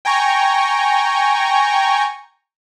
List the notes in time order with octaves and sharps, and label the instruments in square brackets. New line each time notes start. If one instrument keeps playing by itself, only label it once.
[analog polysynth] G5 G#5 A#5 C#6